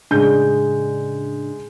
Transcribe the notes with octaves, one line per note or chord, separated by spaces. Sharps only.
A2 C#3 G#3 D4 G6